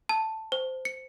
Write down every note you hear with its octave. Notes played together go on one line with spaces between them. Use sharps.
A5
C5
C#7